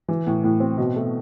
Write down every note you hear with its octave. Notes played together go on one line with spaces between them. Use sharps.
E3
A2
A2
C4
B2
A3